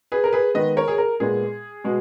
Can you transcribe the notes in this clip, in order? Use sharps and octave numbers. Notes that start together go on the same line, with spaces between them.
G#4 B4
A#4
G#4 B4
D#3 G#3 B3 B4 D#5
A#4 C#5
G#4
A#4
A#2 G#3 B3 G#4
B2 G#3